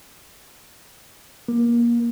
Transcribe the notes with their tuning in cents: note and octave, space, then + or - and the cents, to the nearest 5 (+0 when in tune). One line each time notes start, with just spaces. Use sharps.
A#3 +25